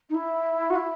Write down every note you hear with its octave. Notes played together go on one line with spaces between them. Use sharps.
D#4
E4
F#4
E4